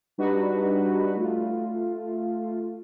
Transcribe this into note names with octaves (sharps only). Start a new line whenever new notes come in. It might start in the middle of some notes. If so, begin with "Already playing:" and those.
G3 D4 D#4 F#4 B4
A3 F4